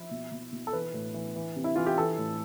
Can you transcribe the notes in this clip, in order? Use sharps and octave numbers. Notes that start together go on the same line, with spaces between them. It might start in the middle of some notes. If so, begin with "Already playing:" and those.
Already playing: F3 E4
B2
B2
B2
A4
E3 B4
A2
E3
E3
C3
E4
E3 F4
G4
E3 A4
A2